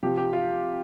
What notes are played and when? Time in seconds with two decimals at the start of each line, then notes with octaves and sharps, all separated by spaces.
0.03 C3 F3 G4
0.17 G4
0.33 F4